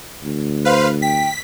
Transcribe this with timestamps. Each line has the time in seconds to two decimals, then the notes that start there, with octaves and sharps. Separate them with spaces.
0.23 D2
0.65 B4 C5 F5
1.02 G5 B6